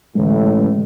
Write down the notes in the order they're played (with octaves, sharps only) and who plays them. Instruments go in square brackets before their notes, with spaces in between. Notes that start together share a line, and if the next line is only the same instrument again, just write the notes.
[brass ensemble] A1 A2 [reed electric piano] D3 G#3